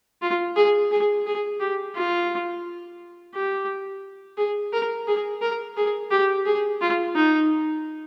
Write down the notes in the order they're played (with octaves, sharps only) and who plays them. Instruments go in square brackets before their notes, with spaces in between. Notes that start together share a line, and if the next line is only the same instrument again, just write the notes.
[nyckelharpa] F4
G#4
G#4
G#4
G4
F4
G4
G#4
A#4
G#4
A#4
G#4
G4
G#4
F4
D#4